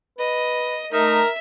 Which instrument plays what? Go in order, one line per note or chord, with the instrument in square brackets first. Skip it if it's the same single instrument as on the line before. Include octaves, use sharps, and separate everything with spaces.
[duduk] B4 [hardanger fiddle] D#5
[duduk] A3 [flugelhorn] D#4 [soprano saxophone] A#4 [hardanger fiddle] E5